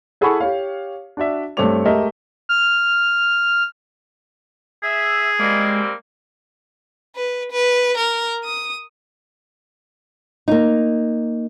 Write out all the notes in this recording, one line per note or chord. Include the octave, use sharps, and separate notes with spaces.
E4 G#4 A4 F#5 B5 C#6
G4 C#5 F5
D4 F#4 D5 E5
G2 A3 C4 C#5 D6 F7
G#3 A3 G4 A#4 D#5 E5
F6
G#4 E5
G3 G#3 A#3 C4
B4
B4
A#4
D#6
A#3 D#4